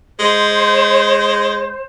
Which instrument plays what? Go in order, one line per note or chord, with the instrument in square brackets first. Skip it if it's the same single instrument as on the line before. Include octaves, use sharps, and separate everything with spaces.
[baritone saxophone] G#3 [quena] C5